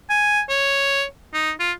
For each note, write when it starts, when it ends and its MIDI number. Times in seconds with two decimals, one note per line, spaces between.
0.10 0.41 80
0.50 1.04 73
1.34 1.51 63
1.60 1.72 65